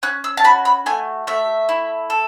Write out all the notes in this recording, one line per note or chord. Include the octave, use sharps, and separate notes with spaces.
C#4 F#6
E6
A5
F#4 B5
B5
A3 G#5
A3 E5
E4
A4